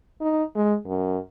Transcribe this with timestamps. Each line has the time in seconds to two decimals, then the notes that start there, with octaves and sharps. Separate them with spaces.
0.21 D#4
0.56 G#3
0.86 F#2